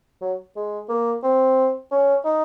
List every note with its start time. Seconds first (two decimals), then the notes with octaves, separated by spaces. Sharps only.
0.21 F#3
0.56 G#3
0.89 A#3
1.23 C4
1.91 C#4
2.25 D#4